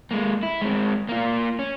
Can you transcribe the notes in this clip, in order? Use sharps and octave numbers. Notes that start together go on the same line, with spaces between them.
G#3 A#3
E4
G#3 C4
A#3 F4
C#4